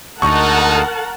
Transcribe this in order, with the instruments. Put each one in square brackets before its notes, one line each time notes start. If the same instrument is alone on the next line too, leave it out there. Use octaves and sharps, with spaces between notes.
[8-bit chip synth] D2 [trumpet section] G#3 D#4 [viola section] A#4 F#5 A5 [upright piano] C#6